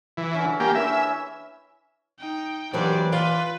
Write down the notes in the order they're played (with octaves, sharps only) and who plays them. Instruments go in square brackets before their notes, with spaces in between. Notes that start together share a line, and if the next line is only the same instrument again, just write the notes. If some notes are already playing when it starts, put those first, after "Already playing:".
[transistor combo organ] E3
[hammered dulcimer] D3 C#4
[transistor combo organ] A#3 G4 [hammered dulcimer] G#5
[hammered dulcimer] E3 C#4 [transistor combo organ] E5
[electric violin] D#4 G5
[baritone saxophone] G2 [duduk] E3 [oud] F#3 A#3 C4 [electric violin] D5
[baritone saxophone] F4 [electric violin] B4 [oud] D5